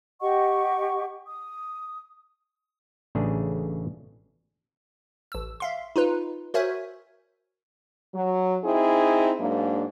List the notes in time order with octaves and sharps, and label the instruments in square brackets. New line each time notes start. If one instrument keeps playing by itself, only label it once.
[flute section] G4 D#5 F#5 C#6
D#6
[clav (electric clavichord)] A1 C#3 A3 D4 G#4
[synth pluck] A1 E6
E5 F5 C6
D#4 F4 B4
F#4 A#4 C5 C#5 E5 G#5
[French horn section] F#3
C4 D#4 E4 G#4
G#2 F#3 A#3 D4